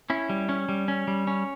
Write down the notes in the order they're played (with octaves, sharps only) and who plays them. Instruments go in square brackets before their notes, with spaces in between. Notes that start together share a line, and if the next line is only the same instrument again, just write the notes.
[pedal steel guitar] C#4 E4
G3
C#4
G3
C#4
G3
C#4